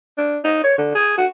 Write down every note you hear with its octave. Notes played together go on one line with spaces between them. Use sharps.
D4
D#4
C#5
D3
G#4
F#4